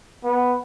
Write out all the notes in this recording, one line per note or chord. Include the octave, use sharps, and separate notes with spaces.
B3